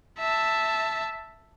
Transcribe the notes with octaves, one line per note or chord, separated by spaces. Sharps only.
E5 A5